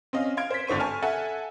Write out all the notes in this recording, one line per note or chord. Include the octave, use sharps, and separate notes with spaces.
C4 C#4 D#5 F5
F5 C6 G#6 D7
C5 B6
G#1 D3 C5 C#6 D#7
G#5 A5 C#6 F6
A4 E5 F#5 G#5